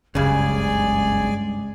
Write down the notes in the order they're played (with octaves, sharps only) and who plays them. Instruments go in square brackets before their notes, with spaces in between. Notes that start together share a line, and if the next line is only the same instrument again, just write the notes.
[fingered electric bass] F#1 C#2 [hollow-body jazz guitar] G2 C#3 [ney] G#3 [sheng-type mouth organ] G#4 D5 G#5